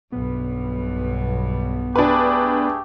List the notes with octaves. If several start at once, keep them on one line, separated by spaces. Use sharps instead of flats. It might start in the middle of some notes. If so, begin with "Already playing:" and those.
B1 G2 B3
A3 D4 G4 G#4 B4